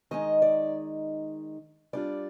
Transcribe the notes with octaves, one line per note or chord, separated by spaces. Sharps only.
D#3 G#3 D#4 D#5
D5
G3 D4 F4 D5